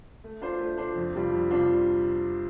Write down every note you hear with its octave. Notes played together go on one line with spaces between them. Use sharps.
A3
D4 F4 C5
A3
D4 F4 C5
F2
C3 G3 D4 F4
F2
C3 G3 D4 F4